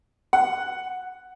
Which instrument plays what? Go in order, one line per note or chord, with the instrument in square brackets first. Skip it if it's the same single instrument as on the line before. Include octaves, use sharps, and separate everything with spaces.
[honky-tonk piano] F#5